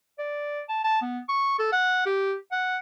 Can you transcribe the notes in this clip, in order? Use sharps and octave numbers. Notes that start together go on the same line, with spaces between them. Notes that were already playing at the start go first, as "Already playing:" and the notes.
D5
A5
A5
B3
C#6
A4
F#5
G4
F#5